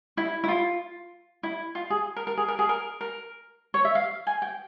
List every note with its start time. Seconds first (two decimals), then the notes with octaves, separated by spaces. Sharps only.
0.17 E4
0.44 E4
0.48 F4
1.43 E4
1.75 F4
1.90 G#4
2.16 A#4
2.27 A#4
2.37 G#4
2.48 A#4
2.59 G#4
2.69 A#4
3.01 A#4
3.74 C#5
3.85 E5
3.95 F5
4.27 G#5
4.42 G5